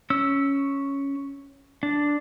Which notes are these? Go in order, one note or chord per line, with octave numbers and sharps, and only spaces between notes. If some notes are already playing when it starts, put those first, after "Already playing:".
C#4 E6
D4